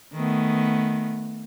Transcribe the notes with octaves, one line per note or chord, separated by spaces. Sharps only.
D#3 A3 B3